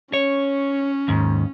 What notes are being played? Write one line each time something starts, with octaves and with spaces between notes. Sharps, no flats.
C#4 C#5
D#2 G#2